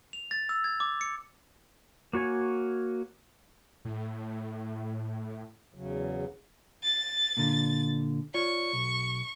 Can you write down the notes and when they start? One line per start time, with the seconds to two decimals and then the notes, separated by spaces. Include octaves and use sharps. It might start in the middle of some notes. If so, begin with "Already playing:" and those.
0.13 F7
0.31 A6
0.49 E6
0.64 G#6
0.80 D6
1.01 C#7
2.13 A#3 F#4 C#5 G#5
3.85 A2
5.74 E2 C#3 F#3
6.83 A6
7.37 A#2 D3
8.34 F4 C#5 D5 C#6
8.73 B1